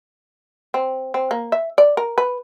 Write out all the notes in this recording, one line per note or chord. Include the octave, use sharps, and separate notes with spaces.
C4
C4
A#3
E5
D5
A#4
B4